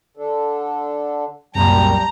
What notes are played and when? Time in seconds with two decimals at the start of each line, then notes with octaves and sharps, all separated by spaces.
0.17 D3 D4 A4
1.55 C2 F#2 A#2 G3 G5 A5 A#5